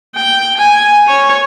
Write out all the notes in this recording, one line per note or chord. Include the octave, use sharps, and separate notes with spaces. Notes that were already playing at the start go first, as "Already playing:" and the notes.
G5
G#5
C#5